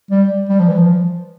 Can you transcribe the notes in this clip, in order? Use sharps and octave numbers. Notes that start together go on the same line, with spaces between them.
G3
G3
F3
E3
F3